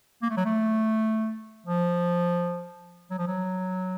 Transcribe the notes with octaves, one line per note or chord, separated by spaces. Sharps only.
A#3
A3
F#3
A3
F3
F#3
F3
F#3